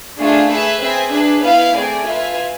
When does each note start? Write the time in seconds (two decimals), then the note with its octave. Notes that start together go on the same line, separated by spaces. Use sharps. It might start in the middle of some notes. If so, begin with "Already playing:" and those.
0.20 A3 D4 F4 G#4
0.51 G#4 B4 E5
0.81 C4 G#4 B4 E5
1.13 D4 G#4 B4
1.44 B3 E4 B4 F5
1.75 A3 C4 G#4 D5 G#5
2.06 F4 B4 E5 G#5